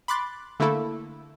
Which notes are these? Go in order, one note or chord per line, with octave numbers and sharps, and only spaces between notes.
B5 C6 D6 F#6 A6
D3 A3 A#3 E4 A4